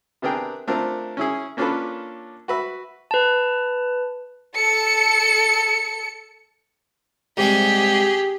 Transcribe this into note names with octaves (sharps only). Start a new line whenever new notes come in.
C3 B3 D4 G#4 A#4 G5
A3 C4 D4 F4 A#4
C#4 E4 G#4
A#3 C#4 D4 F4 A4 B4
F#4 B4 E5
B4 A5
A4 C#7
G#2 C3 G3 G4 G#4